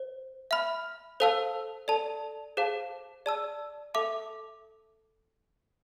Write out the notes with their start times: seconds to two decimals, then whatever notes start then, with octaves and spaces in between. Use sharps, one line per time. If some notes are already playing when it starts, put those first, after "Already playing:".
Already playing: C5
0.51 E5 B5 F6
1.20 A4 C5 F5 A5 E6
1.88 A4 D5 A5
2.57 G#4 C5 F5 A5
3.26 G#4 D5 A5 E6
3.94 A4 E5 A5 D6